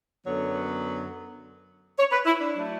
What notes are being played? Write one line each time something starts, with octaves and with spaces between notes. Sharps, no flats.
F#2 D3 F#3 B3 C#5
C#5
B4
E4
D4
F#3 A3